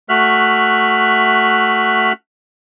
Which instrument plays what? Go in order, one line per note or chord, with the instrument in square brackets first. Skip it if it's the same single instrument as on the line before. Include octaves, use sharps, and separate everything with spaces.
[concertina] A3 F#4 E5 F6 F#6